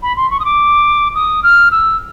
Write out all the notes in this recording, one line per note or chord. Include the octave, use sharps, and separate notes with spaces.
B5
C6
C#6
D#6
D6
D#6
F6
E6